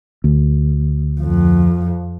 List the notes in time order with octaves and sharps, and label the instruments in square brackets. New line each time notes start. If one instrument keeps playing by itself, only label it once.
[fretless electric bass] D2
[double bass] F2